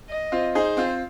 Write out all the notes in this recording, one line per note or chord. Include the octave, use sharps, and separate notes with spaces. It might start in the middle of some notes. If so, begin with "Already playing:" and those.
D#5
C4 F4
D#4 G#4 C5
C4 F4